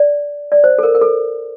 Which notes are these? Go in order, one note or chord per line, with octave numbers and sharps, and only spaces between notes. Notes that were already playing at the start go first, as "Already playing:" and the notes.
Already playing: D5
D5
C5
A4
A#4
A#4
A4